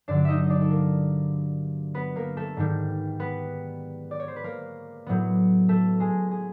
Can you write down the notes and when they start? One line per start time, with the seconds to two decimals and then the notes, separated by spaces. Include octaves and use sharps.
0.08 G2 D3 F#3 D4 D5
0.25 D#4 D#5 E5
0.44 D#5
0.50 D4 D5
0.61 A4
0.70 A#3 A#4
1.94 B3 B4
2.16 A#3 A#4
2.37 A3 A4
2.57 G#2 D#3 G3
3.20 B3 B4
4.11 D5
4.20 C#5
4.28 C5
4.36 B4
4.44 A#3 A#4
5.06 A2 F#3 B3
5.69 A3 A4
6.00 G#3 G#4
6.31 G#4